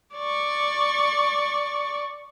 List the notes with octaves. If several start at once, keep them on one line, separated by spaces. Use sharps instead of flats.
D5 C#6